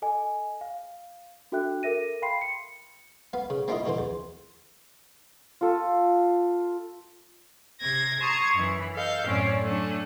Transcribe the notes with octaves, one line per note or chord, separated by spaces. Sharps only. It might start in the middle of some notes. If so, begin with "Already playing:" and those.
A4 D#5 G#5
F5
D4 F#4 A4 E5 G5 F#6
A4 A#4 E5 A#6 D#7
F5 G5 B5 C6 C7
C#7
B3 F5
C#3
A#3 C4 D4 E4 F4 D#5
B2 D3 E3 C5
E2
F4 A4
C3 G#6 A#6
A5 A#5 C6 C#6 D#6 G#6
F#2 E3
A4 D#5 F5 G6
F#2 A2 C4 C#4 C#5 D5
F#3 A3 C#4 D4